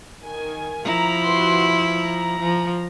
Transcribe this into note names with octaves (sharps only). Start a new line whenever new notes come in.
D#3 G#5
F3 E4 A#5
F#4 B4 C6
A#5
F3